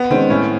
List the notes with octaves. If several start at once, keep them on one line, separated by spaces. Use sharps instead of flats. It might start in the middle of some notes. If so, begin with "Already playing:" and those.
Already playing: B3
D#3 G#3 C4 C#4
A2 C#4